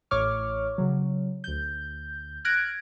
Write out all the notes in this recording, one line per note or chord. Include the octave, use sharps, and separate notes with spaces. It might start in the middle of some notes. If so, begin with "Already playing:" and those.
A1 A2 C#5 C#6 D6 F6
C#3 F#3
D2 G6
F6 F#6 G#6 A#6 D7